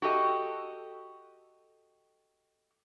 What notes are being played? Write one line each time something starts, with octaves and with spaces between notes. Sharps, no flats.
F#4 G4 A4 D#5